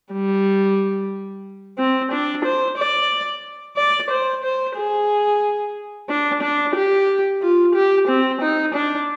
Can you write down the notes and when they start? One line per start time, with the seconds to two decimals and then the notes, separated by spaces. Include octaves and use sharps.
0.13 G3
1.78 C4
2.11 D4
2.45 C5
2.78 D5
3.77 D5
4.10 C5
4.43 C5
4.76 G#4
6.09 D4
6.42 D4
6.75 G4
7.42 F4
7.75 G4
8.08 C4
8.41 D#4
8.74 D4